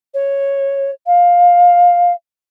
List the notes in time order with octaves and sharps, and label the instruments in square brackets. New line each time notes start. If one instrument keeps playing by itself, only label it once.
[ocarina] C#5
F5